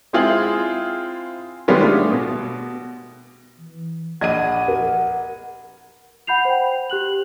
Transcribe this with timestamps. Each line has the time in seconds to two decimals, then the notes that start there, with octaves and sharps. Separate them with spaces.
0.13 G#3 C4 E4 F4 G#4 F#7
1.68 D#3 G3 G#3 B3 C#4 F4
1.82 A3 D4
2.12 B2
3.58 E3
4.21 A#1 D#5 F#5 G#6 D#7
4.68 A#4
6.27 F#5 B5 G6 C7 F7
6.45 C5 G5
6.90 G4 F#6 F#7